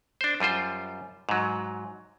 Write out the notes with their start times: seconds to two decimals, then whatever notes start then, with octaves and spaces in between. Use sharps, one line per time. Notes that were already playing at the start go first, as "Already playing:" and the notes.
0.21 D4 C5
0.40 F#2 G3 F4 C5
1.29 G#2 F#3